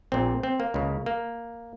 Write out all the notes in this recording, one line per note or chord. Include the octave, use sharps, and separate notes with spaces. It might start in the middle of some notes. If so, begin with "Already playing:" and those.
A#1 A#2 C4
C4
A#3
C#2 C#3
A#3